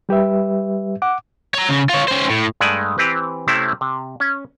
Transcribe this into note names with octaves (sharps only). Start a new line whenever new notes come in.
G3 G4 B4 E5
F#5 D6
C#5 A#5
C#3
F4 C#5
C#4 C5
A2
G2 G#3 A3 D5 F#5 G#5
E3 C4 G4 B4
C3 A3 C4 C#4 E4
C3
C#4